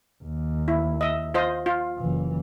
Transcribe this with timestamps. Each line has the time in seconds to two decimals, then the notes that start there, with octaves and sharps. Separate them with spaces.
0.23 D#2
0.68 E4
1.01 D#5 E5
1.34 F4 C5 D#5
1.66 F4
1.98 F#1 E3